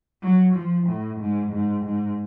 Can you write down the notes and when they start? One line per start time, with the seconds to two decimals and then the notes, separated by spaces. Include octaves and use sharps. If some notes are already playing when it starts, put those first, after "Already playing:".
0.22 F#3
0.55 F3
0.87 A2
1.20 G#2
1.53 G#2
1.86 G#2